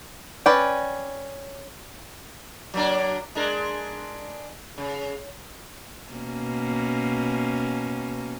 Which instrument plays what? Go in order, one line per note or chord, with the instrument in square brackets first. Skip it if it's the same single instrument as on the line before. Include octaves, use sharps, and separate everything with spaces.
[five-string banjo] C#4 B4 D5 G5
[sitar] F#3 A#3 D4
G#3 D4 A#4
C#3
[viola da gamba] B2 A#3 C#4